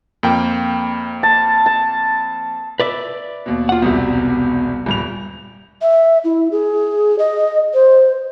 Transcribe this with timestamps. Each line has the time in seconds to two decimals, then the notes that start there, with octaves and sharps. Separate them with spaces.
0.23 F2 A#3 G5
1.23 A5
1.66 A5
2.80 B4 D5 E5
3.46 D#2 B2
3.69 F4 F#5
3.82 E1 C2 C3 B3
4.86 D#1 G2 F7
5.82 E5
6.24 E4
6.52 G#4
7.19 D#5
7.74 C5